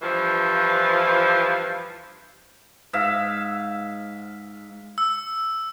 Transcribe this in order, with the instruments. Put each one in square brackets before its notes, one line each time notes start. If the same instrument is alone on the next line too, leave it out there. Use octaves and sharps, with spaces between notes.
[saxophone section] G2 E3 F3
[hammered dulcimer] G#2 E5 F5
[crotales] E6